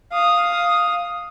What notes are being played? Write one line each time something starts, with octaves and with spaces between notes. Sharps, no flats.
F5 D#6